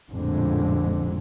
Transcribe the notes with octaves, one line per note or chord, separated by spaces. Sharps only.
A1 F2 A#2 D3 G#3